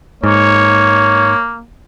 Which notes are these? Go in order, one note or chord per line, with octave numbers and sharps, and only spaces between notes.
G#2 A#3 C#5